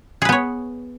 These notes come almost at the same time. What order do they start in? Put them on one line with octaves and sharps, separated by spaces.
G#4 B4 B3 C#5